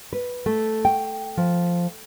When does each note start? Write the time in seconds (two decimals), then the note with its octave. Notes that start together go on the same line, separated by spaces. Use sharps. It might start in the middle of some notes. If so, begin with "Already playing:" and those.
0.13 B4
0.46 A3
0.85 G5
1.37 F3